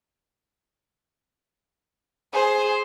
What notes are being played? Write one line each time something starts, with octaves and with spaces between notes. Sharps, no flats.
G#4 C5